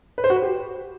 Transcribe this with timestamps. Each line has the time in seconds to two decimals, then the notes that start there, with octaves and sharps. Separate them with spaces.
0.18 B4
0.24 C5
0.30 F#4
0.36 B4
0.42 G4